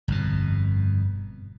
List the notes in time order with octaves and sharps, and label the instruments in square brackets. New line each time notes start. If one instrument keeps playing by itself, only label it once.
[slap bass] G1 F2 B2